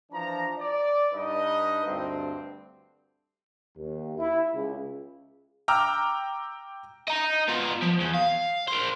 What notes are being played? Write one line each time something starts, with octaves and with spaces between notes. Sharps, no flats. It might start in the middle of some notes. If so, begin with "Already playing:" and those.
E3 F3 D4 A5 A#5
D5
G2 D#4 B4 D#5
D2 G2 C4
D#2
E4
C#2
G5 A#5 D6 E6 F6
D#5 A#5
B3 F4
F3
E2
F5
A#4 C5